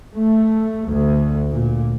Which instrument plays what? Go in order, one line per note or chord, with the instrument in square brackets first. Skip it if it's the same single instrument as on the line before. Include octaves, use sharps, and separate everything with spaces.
[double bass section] A3
D2
A#2